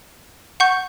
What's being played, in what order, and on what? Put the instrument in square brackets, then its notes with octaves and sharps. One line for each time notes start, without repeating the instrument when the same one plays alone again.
[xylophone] F#5 C#6 G6